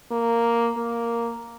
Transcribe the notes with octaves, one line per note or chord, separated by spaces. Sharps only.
A#3
A#3